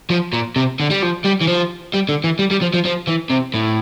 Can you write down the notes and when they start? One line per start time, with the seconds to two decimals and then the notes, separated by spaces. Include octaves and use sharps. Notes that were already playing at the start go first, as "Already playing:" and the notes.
0.10 F3
0.33 A#2
0.56 C3
0.80 D3
0.90 G3
1.02 F3
1.24 G3
1.41 E3
1.47 F3
1.94 G3
2.09 D3
2.24 E3
2.39 G3
2.51 G3
2.62 F3
2.74 F3
2.85 F3
3.08 E3
3.30 C3
3.54 A2